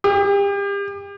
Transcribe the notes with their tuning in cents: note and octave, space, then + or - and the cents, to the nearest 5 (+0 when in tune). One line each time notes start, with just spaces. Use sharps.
G4 +35